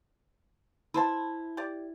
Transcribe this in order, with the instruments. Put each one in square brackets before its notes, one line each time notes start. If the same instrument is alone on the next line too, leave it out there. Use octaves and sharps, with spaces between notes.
[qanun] E4 [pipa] B4 C5 A5
[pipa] G4 D5